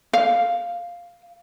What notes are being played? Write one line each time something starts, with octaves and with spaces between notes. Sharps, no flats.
F5